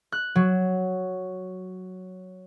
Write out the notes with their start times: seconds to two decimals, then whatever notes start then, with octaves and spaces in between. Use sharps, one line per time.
0.12 F#6
0.36 F#3